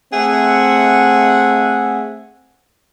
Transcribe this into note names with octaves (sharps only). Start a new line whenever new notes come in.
A3 C4 G#4 E5 F#5